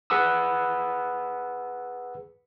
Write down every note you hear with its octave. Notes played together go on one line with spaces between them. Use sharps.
G#4 B4 F#5 B5 D#6 E6